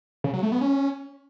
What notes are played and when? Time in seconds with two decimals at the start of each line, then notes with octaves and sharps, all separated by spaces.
0.24 C#3
0.33 F#3
0.43 A3
0.52 B3
0.61 C#4